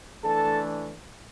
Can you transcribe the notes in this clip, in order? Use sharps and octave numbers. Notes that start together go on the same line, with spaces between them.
E3 A3 D4 A4 A5